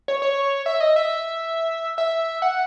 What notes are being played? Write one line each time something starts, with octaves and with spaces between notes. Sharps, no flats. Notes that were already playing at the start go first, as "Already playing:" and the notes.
C#5
C#5
E5
D#5
E5
E5
F#5